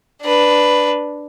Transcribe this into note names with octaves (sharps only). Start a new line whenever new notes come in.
D4 B4